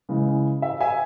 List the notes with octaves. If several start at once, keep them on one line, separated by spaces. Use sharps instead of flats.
C#3 E3 G#3
E5
E5 G#5